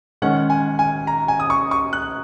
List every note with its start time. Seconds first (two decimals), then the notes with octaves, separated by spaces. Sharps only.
0.22 D#3 G#3 C#4 F#5
0.50 G#5
0.79 G#5
1.07 A#5
1.28 G#5
1.40 D#6
1.50 C#6
1.71 C#6
1.93 F#6